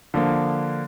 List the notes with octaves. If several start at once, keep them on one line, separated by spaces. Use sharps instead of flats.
D3 F3 A#3